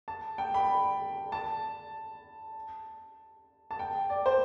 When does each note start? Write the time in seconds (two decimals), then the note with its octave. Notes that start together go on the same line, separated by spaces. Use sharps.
0.08 A5
0.38 G5
0.54 B5
1.32 A5
3.71 A5
3.79 G5
4.10 D5
4.26 C5